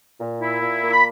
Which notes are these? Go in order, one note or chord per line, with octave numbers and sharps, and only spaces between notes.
A#2
E4
A#2
A#3
B5